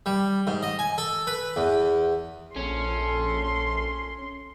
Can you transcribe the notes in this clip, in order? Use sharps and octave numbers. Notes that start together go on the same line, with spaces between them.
G3
G#2
D#5
G#5
A4
B4
E2
A#1 C#4 A4 C6